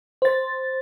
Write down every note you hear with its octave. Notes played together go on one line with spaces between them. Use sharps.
C5 A6